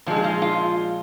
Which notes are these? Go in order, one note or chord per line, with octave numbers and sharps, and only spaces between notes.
A#2 F3 G#3
G#4
F4
F4